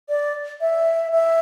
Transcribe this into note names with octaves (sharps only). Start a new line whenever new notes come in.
D5
E5
E5